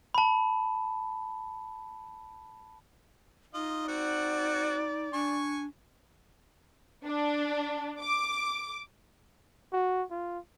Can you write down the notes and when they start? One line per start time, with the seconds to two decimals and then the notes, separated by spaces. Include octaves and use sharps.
0.14 A5 B5
3.54 D#4 F4 D#5
3.88 C4 F#4 D5 F#5
5.13 D4 G#5 C#6
7.05 D4
8.01 D6
9.73 F#4
10.11 F4